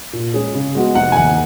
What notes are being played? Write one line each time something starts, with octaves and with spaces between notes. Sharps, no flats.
A#2
G#3 C#4 G#4
C#3
G#3 B3 F#4
F1 F#5
G#5
D#2 D#3 F#5